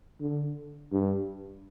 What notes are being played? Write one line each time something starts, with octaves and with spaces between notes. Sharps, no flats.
D3
G2